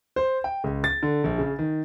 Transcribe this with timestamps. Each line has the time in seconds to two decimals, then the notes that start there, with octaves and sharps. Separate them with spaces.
0.16 C5
0.44 G5
0.64 C#2
0.84 A6
1.03 D3
1.24 A#1
1.38 C#3
1.59 D#3